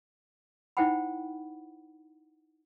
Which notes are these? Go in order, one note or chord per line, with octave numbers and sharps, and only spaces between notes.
D#4 E4 C5 F#5 G5 B5